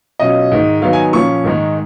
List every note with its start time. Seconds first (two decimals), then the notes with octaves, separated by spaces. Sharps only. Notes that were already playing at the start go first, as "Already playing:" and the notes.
0.20 B2 F#3 C#4 F4 D#5
0.52 G#2 D#3 A#3
0.82 D#3 F#3 B3 D#4 F5
0.93 G#5
1.13 A#2 F3 A#3 C#4 C#6
1.44 G#2 D#3 G#3 D#4